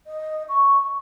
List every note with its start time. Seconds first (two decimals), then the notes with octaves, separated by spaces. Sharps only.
0.06 D#5
0.49 C#6